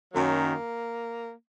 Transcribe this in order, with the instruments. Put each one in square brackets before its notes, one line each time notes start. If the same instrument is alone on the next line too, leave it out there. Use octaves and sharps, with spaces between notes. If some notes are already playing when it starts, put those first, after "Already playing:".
[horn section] F#2 D#3 F#3 A#3